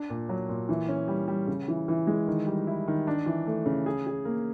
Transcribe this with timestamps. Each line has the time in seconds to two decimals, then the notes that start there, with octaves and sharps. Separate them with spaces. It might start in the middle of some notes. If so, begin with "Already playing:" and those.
Already playing: D4
0.10 A#2
0.29 F#3
0.49 A#2
0.69 E3
0.89 C#4
1.08 G3
1.28 G3
1.47 C#3
1.68 E3
1.88 E3
2.07 G#3
2.27 D#3
2.47 G3
2.67 E4
2.88 D#3
3.07 D4
3.26 E3
3.47 A3
3.66 C#3
3.86 G#4
4.07 G#4
4.25 A#3